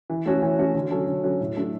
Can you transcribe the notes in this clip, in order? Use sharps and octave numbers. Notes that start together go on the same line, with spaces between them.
E3
A3 C#4 F#4
E3
A3 C#4 F#4
D3
F#3 C#4 F#4 A4
D3
F#3 C#4 F#4 A4
A2
F#3 A3 D4 A4